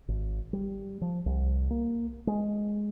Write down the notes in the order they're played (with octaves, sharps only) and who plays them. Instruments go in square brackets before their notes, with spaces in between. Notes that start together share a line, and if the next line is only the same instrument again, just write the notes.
[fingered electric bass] G#1
G3
F3
C2
A#3
G#3